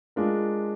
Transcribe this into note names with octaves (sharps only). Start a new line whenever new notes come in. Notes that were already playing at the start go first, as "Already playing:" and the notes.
G#3 D4 F4 A#4